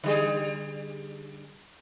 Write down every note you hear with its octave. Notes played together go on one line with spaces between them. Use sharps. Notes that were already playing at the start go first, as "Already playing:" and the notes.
D3 G3 G#4